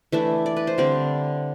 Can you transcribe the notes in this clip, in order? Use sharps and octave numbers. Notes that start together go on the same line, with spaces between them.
E3 A3 D4 E5
D5
B4
C5
D3 G3 C4 D5